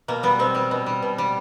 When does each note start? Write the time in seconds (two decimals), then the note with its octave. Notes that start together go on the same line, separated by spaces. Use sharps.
0.08 B2 A#3
0.23 G3 B3
0.39 B2 C4
0.55 G3
0.71 B2
0.86 G3
1.03 B2
1.18 G3